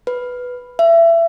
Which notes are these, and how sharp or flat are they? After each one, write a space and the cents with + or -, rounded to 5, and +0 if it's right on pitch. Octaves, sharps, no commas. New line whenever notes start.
B4 +0
E5 +25